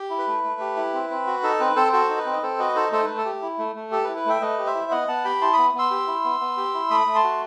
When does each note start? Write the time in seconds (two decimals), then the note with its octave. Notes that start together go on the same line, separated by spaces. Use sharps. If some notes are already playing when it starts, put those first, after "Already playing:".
Already playing: G4
0.10 E4
0.19 B4
0.28 A3
0.44 A3
0.60 G4
0.77 E4
0.94 C4
1.10 C4
1.27 F#4
1.43 D#4 A4
1.60 C4 B4
1.76 C4 A4 C5
1.92 F#4 A4 C5
2.09 D#4
2.17 B4
2.26 C4
2.33 D#5
2.43 C4 A4 C5
2.59 F#4 B4 D#5
2.75 D#4 A4 C5
2.92 A3 A4 C5
3.05 A3 B4
3.17 A4
3.25 G4
3.42 E4
3.58 A3
3.76 A3
3.91 G4 A4
4.04 B4
4.08 E4
4.16 B4
4.25 A3 E5 G5
4.41 A3 B4 D#5
4.58 G4
4.67 C5 E5
4.75 E4
4.91 B3 D#5 F#5
5.08 B3 F#5 A5
5.24 G4 G5 B5
5.41 E4 A5 C6
5.53 B3 B5 D#6
5.74 B3 C6 E6
5.91 G4
6.07 E4
6.24 B3
6.40 B3
6.57 G4
6.74 E4
6.90 A3 B5 D#6
7.07 A3
7.15 A5 C6
7.24 F#4